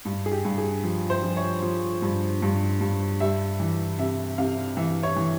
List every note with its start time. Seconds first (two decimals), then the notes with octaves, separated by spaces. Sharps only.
0.05 G2
0.26 G#4
0.32 G4
0.45 G2
0.58 G#4
0.84 F3
1.10 C5
1.23 F3
1.37 C#5
1.62 F3
2.02 G2
2.42 G2
2.81 G2
3.20 G3 E5
3.60 E3
3.99 C3 E5
4.38 C3 F5
4.77 E3 E5
5.03 C#5
5.16 E3